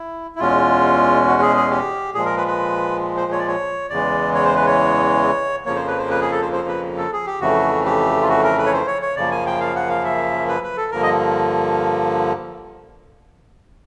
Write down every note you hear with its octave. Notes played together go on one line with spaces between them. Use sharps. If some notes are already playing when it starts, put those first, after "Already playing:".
Already playing: E4
E4
E2 B2 G#3 C#4 F4
F#4
G#4
G#4
G4
A#2 F3 G#3 G#4
A#4
B4
B4
C5
C#5
D5
C#5
E2 C#3 E3 G#3 D5
C#5
C5
B4
C#5
F2 C#3 F3 A#3 C#5
C5
B4
C5
B4
G#4
A4
C5
C5
B4
A4
G#4
G4
F2 C#3 E3 A3 F#4
G4
F4
F#4
A#4
B4
C#5
C5
C#5
C#5
F#2 C#3 F3 A#3 D5
G#5
G5
F5
F#5
F5
E5
B4
B4
A4
G2 D3 F3 A#3 A#4
D#5